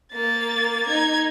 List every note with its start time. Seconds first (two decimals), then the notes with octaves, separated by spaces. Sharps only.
0.12 A#3 A6
0.87 D#4 G#6